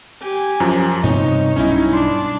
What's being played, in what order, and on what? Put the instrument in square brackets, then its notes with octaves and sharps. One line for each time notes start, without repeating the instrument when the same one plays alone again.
[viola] G4 G#5
[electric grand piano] F#2 F3 A#5
[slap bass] G2 C3 B3 [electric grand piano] D#4 D#5 [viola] C#5
[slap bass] B1 G2 [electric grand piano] C#4 D#4 E4
[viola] D4 [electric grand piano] C6